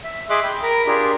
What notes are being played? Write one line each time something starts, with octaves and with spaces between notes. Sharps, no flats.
E5
G#4 D#5 E5 C6 D6 F#6
G5 B5
A#4 A#5 B5
D4 F4 G4 G#4 A#4